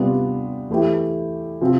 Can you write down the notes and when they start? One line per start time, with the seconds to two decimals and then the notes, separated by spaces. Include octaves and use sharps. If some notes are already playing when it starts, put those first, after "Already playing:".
Already playing: C3 G3 B3 D4 F4
0.70 E3 A3 E4 G4
1.61 C3 F3 C4